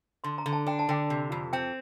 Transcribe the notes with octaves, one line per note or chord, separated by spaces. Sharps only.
D3 C6
A#5
D3
A5
D4 G5
A5
D3 G5
C3
F2
C4 G5